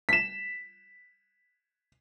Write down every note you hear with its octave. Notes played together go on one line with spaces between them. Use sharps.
B6 E7